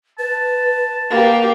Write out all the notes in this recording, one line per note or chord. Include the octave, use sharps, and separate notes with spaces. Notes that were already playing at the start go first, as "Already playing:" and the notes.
B4 A5
A#3 G4